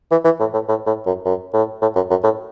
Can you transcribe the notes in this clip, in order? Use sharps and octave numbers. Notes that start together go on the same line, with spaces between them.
E3
E3
A2
A2
A2
A2
F#2
F#2
A2
A2
F#2
F#2
A2